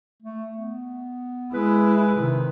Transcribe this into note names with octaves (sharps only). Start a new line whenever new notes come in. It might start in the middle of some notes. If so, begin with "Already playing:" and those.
A3
B3
G#3 E4 B4
C3 D#3